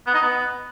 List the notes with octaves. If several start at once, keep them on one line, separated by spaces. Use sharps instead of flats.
B3
D#4
B3